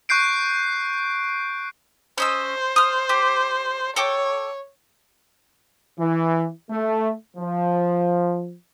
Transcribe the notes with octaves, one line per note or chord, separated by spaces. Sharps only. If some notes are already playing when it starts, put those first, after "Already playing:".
C#6 F#6 G6 C7 D7
C#4 C5 D#5 E6
D#6 F6
G4
A4 C#5 G5 D6
E3
A3
F3